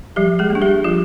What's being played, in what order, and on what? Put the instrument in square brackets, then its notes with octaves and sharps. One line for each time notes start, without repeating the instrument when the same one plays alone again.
[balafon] F3 G3 G4
G#3 G#4
A#3 D4
G3 G4
F3 F4